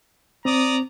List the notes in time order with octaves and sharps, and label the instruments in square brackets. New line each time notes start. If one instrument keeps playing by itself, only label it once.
[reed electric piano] C4 [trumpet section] D5 A#5 D#6